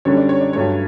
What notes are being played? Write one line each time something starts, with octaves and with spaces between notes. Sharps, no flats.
F#2 D3 G3 C#5
D5
C#5
D5
G2 F#3 A3 C#5